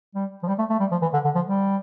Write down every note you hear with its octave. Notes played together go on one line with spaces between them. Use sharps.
G3
F3
G3
A3
A3
G3
F3
E3
D3
D3
F3
G3